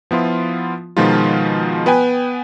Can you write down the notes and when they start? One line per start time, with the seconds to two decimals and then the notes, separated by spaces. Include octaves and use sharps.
0.11 F3 B3 E4 F4
0.97 B2 D#3 F3 G#3 D#4 F4
1.86 B3 B4 G5 G#5